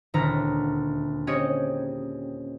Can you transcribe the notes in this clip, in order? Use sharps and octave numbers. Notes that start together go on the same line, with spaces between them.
D#1 D2 E4 A#5
C4 C#4 G4 G#4 C#5 D#5